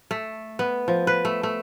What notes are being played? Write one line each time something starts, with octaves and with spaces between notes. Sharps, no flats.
A3
B3
F3
B4
A3
A3